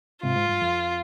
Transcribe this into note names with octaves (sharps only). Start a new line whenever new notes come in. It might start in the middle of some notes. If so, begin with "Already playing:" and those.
G#2 C3 F4
G#2
G2
F2